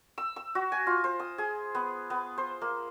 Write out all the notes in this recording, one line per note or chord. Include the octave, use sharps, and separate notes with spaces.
E6
E6
F#4
G#5
F4
C5
D#6
G#4
B3
B3
C5
A#3